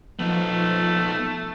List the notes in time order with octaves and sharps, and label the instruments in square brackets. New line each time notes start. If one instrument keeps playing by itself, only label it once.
[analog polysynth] F3 [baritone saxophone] A3 [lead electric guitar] B3 D#4